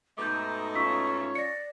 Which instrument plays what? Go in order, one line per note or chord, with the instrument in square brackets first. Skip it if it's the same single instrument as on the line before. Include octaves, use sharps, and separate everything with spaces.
[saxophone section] G#2 B2 A3 [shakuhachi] D#4 [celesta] D6 G6
[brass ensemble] C#4 F4 C#5 [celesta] C#6 E6 B6
[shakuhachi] D5 [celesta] A#6 C#7